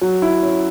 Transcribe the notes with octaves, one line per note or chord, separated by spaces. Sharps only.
F#3
E4
C#4